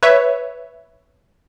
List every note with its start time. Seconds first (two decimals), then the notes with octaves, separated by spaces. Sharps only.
0.03 B4 C#5 E5